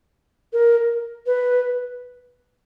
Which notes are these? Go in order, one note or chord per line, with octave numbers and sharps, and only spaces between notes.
A#4
B4